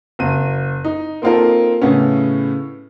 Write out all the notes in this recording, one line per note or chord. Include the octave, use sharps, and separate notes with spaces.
F#1 D#7
D#4
A#3 C4 D#4 F4 A4 A#4
A2 C#3 B3 C#4